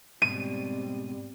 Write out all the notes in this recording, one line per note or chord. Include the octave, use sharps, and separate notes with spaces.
G#2 B2 G3 C4 D#7